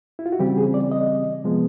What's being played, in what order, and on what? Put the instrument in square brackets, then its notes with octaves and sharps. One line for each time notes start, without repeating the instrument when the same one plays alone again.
[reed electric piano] E4
F4
F#4
C#3 E3 G3 C4 G4
G#4
D5
D#5
C3 F3 G#3 B3